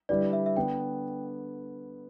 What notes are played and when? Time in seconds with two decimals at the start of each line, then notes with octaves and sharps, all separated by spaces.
0.09 D3 G3 E4 G4 B4 D5
0.33 E5
0.46 E5
0.57 D3 B3 D4 G5